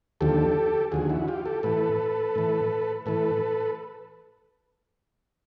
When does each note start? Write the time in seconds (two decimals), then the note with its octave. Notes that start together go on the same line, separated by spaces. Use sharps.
0.21 D#2 D3 F3 G4 A4
0.92 D#2 D3 F3 F#4 G#4
1.09 E4 F#4
1.28 F4 G4
1.45 G4 A4
1.63 A2 E3 A4 B4
2.35 A2 E3
3.06 A2 E3 A4 B4